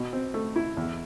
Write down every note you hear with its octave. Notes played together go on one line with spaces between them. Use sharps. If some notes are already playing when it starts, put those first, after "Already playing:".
Already playing: B2
C4
A3
E4
E2